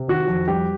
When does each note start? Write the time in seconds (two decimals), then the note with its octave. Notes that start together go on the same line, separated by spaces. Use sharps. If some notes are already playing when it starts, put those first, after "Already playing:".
Already playing: C3
0.08 D#3 F#4
0.28 F2
0.48 G3 G4